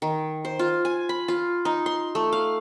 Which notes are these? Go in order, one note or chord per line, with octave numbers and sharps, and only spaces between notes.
D#3
C5
F4
G#5
B5
F4
D#4
C6
A3
F5